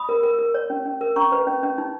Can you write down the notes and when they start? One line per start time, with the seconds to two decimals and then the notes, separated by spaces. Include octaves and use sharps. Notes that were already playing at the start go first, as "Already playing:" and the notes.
Already playing: B5 D#6
0.09 A#4
0.23 A#4
0.38 A#4
0.54 C#5
0.70 C#4
0.85 C#4
1.01 A#4
1.16 C#4 A#5 C#6
1.32 B4
1.47 C#4
1.63 C#4
1.78 D#4